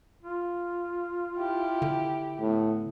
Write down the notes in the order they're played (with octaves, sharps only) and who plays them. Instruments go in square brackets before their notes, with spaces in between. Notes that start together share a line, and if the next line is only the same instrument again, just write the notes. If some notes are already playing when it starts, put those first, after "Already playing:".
[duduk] F4
[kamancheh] E4 G4
[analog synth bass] D3
[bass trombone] A2 [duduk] B3